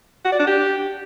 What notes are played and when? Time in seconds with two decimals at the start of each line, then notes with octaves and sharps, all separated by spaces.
0.25 F#4
0.32 D5
0.40 D4
0.47 G4